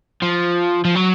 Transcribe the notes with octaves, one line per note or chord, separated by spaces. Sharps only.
F3
F3
F#3